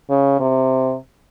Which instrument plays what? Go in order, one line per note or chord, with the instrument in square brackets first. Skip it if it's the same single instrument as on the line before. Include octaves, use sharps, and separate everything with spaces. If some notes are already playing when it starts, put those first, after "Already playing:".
[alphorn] C#3
C3